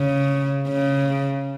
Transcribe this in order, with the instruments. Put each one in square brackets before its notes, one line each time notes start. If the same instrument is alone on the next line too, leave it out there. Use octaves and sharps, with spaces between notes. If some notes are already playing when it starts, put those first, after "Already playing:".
Already playing: [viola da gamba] C#3
C#3